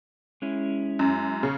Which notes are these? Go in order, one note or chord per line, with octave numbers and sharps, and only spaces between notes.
G#3 C#4 E4
F#2
C#3